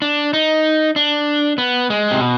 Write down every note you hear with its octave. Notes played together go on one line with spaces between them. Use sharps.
D4
D#4
D4
B3
G#3
C3
B2